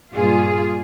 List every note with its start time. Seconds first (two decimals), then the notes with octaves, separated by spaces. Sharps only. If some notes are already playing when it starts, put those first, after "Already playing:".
0.14 G2 A#2 F4 G#4